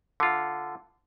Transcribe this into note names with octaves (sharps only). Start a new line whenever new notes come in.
D3 F4